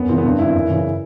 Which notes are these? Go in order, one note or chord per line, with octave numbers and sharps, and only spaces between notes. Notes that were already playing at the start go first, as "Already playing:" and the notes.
Already playing: F#2 B3
C#3 E3 C4
B3
G2 C4
D#3 E4
F#2
C#3 E3